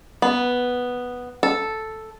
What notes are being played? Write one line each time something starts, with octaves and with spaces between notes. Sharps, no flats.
B3
A4